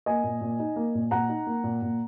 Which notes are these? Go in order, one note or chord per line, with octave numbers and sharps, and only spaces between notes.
A#3 D#5 G#5
A#2
A#2
D#4
A#3
A#2
A#2 F#5 A#5
D#4
A#3
A#2
A#2